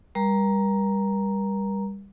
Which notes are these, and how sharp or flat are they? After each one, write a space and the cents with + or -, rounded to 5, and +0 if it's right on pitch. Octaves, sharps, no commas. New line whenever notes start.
G3 +20 A#4 +35 A#5 +0